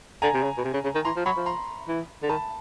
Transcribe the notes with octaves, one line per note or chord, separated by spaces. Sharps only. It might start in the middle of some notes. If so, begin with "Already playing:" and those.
D3 G#5 A#5
C3
C#3
B2
C3
C#3
C#3
D#3
E3 A#5 C6
F3
F#3 B5 C#6
F3
A#5 C6
E3
D3
D#3 A5 B5